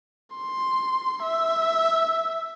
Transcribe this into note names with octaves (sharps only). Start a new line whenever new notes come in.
C6
E5